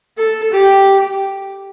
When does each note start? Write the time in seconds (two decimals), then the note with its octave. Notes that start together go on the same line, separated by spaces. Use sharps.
0.17 A4
0.52 G4